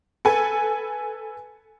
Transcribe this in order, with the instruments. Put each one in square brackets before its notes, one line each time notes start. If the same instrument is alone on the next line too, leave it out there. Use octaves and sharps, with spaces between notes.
[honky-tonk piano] A4 B4 G#5